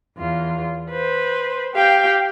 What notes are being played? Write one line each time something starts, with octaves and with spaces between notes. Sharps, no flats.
E2 F4
B4 C5
G4 F5 G5